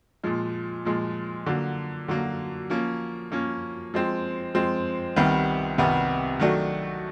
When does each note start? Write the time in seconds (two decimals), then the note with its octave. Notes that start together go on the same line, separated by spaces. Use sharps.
0.24 A#2 F3 G#3
0.85 A#2 F3 G#3
1.46 D3 F#3 A#3
2.08 D3 F#3 A#3
2.70 F3 A#3 C#4
3.32 F3 A#3 C#4
3.94 F3 G#3 C4
4.55 F3 G#3 C4
5.16 C2 C3 D#3 G3 B3
5.78 C2 C3 D#3 G3 B3
6.40 D#3 F#3 A3 D4 F#4